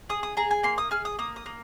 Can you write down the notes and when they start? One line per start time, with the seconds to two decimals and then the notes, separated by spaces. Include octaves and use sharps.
0.09 G#4 D#6
0.23 D#6
0.37 G#4 A#5
0.51 G#5
0.63 A#3 C6
0.78 D#6
0.91 G#4 F6
1.05 D#6
1.19 A#3 D#6
1.36 D#6
1.46 A#3